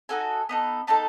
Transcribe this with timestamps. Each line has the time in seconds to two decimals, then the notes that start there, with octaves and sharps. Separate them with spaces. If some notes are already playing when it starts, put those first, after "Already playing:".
0.09 D#4 F#4 A4 G#5
0.49 B3 D#4 A4
0.87 B3 D#4 A4 A5